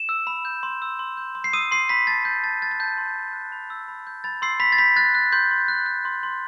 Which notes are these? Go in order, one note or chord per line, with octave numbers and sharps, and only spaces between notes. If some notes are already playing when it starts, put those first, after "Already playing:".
Already playing: E7
E6
B5
G6
C6
E6
C6
G6
C6
C7
D#6 E6 D#7
C6 C7
B5 G6 B6
A5 A6
C6 G6
A5 A6
F#6 A6
A6
A5 G6
C6
A5
F#6
B5
E6
B5
G6
B5 A6
C6 E6 C7
B5 B6
A6
B5 G6 B6
F#6 A6
F#6
C6 G6
C6
F#6
F#6
C6
C6